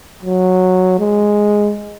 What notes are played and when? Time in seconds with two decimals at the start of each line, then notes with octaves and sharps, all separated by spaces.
0.23 F#3
0.99 G#3